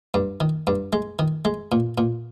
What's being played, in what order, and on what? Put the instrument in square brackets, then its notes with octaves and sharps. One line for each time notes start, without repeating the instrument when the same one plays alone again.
[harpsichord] G2
D#3
G2
G#3
D#3
G#3
A#2
A#2